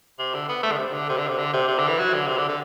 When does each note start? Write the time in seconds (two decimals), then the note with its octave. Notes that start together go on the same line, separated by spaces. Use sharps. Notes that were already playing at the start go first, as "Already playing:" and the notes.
0.19 C3
0.34 D3
0.49 B3
0.63 A3
0.71 D3
0.78 C3
0.93 D3
1.09 C3
1.18 D3
1.28 C3
1.38 D3
1.54 C3
1.68 C3
1.78 D3
1.88 E3
1.99 F#3
2.14 D3
2.28 C3
2.38 D3
2.49 D3